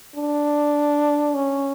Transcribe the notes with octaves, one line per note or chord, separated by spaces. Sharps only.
D4
C#4